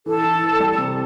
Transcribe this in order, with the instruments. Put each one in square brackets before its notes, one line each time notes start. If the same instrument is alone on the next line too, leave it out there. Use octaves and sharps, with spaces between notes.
[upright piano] E3 [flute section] A4
[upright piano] E3
E3
G3
C3